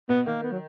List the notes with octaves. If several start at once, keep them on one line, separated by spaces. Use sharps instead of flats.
B2 B3
D#3 A#3
B3
F#3